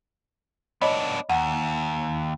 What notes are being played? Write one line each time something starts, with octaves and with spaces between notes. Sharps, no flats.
B3 D4 C#5 D#5 B5
D#2 F#5 A#5